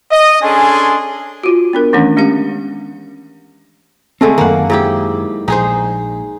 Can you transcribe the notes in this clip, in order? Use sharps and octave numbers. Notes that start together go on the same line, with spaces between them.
D#5
C#4 D4 G#4 A4 G#5 C6
F4 F#4
B3 D4 A#4
D#3 E3 A3 C#4 D4
G#3 C#4 G4 F5
D3 G#3 A3 C4
F#2 D#3 A#3 F#5
G#2 E4 G4
A#1 D#4 G#4 C5